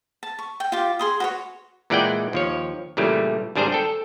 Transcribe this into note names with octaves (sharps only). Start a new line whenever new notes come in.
A5
C#6
G5
F4 G4
G#4 C6 D#6
F#4 B4 C#5
A#2 E3 G#3 D5 F#5 G5
D#2 F3 C#5
A#2 C#3 E3 G3 A3
G#1 G3 D4 G#4 C5 A#5
A4 G5